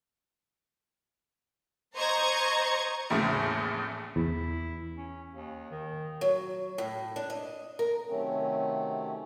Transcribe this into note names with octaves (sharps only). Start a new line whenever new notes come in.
C5 D#5 A#5 C#6 G#6
A#1 E2 A2 C#3 A3
E2 E4
C#4
D#2
D#3
F#3
A2
D4
D#5
A#4
C3 D#3 F#3 A3 C4 C#4